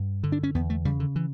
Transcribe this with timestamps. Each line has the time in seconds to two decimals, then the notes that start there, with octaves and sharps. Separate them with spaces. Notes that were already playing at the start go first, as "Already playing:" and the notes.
Already playing: G2
0.23 D3
0.32 D4
0.43 C#4
0.55 E2 B3
0.70 A3
0.85 C#3 G3
1.00 D3
1.16 E3